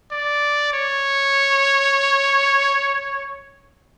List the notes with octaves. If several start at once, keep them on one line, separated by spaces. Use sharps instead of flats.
D5
C#5